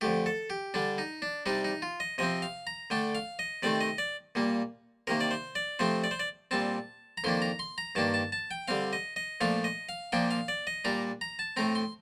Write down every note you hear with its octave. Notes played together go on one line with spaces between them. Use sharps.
F2 D3 A3 G4
A4
G4
D3 G3 D4
D#4
D4
C3 G3 D4 D#4
D#4
F4
D#5
C3 F3 C4 D#5
F5
A#5
D3 A3 D4 G5
F5
D#5
C3 D#3 A3 C4 D5
D#5
D5
A#2 G3 A#3
C3 D#3 A#3 A#4
D5
C5
D5
C3 F3 A3 C4 C5
D5
C5
D5
A#2 G3 C4 A5
A#5
F2 D#3 A#3 D4 C6
A#5
C6
A#5
G2 D#3 A#3 D4 A5
A5
A5
G5
D3 G3 C4 F5
D#5
D#5
A#2 F3 A3 D4 F5
D#5
F5
A#2 F3 A#3 D4 G5
F5
D5
D#5
A#2 G3 D4 A#5
A#5
A5
A2 A3 C4 A#5
C6